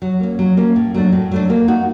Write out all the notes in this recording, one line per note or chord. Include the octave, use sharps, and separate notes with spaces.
F#3
A#3 C#4
F#3
A#3 C#4
A2
F#3 A3 D4
A2
F#3 A3 D4
A#3
D#4 F#4